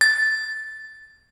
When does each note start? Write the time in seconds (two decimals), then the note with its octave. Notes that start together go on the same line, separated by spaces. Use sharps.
0.01 A6